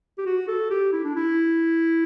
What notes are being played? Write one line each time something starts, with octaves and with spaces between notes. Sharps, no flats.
G4
F#4
A4
G4
E4
D4
E4